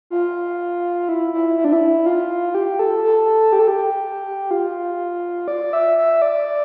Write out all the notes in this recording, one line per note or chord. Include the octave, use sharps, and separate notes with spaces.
F4
E4
E4
E4
D4
E4
F4
G4
A4
A4
G4
A4
G4
F4
D5
E5
E5
D5